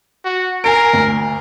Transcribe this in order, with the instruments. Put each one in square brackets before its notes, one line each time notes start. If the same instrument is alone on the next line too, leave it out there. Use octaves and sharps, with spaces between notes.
[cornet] F#4
[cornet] A#4 [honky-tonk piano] G#5 C7 D7
[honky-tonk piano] D2